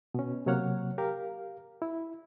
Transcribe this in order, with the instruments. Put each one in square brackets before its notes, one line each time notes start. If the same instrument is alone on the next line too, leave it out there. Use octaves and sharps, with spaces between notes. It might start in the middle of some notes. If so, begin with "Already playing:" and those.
[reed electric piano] B2 C#4
C3 F#3 A#3 C#5 F#5 F6
G4 A#4 F5
E4